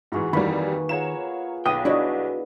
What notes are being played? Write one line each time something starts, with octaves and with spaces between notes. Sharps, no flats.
G#2 E3 F#4 G#4 D#5
F2 D#3 E3 G3 A#3 B4 G#5 B5
F4 G#4 C#5 F#5 A#5 E7
B1 B3 G5 D#6
D4 E4 F#4 C#5 D#5